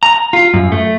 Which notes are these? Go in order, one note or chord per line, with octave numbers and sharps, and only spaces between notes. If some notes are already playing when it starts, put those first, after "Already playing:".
A#5
F4
F#2
A3